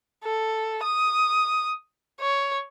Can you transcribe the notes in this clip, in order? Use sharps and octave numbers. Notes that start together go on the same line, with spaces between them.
A4
D#6
C#5